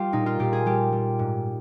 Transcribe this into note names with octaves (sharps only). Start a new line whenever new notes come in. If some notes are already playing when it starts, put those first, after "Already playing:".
Already playing: G3 F4 G4
A#2 D#4
F4
A#2 G4
G#4
G3 G4
G3
G#2